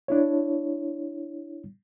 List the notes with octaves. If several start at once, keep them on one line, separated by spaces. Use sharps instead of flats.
D4 E4 C#5